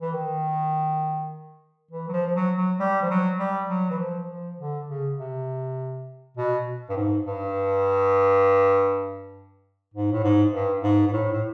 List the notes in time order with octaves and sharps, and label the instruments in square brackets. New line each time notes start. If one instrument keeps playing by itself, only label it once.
[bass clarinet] E3
D#3
E3
F#3
F3
F3
F#3
F#3
G3
F3
F#3
G3
F#3
E3
F3
F3
D3
C#3
C3
B2
G2
G#2
G2
G#2
A2
G#2
G2
G#2
G#2
A2
A2